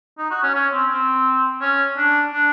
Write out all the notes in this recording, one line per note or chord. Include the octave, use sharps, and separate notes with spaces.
D#4
F#4
C#4
C#4
C4
C4
C#4
D4
D4